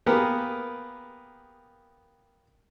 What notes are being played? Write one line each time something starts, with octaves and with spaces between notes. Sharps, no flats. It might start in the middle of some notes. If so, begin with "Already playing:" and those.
A#3 B3 G4 G#4 A#4 B4